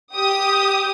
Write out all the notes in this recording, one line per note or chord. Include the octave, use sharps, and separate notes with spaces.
G4 D#6